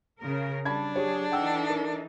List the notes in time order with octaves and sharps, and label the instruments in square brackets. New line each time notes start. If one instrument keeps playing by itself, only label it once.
[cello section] C#3 A#4
[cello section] G3 [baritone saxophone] D4 [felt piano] A5 B5 G#6
[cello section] F#3 G#4 [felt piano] G4 C#5
[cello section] E3 D#4 A4 [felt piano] F#5 G5 E6
[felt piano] A#4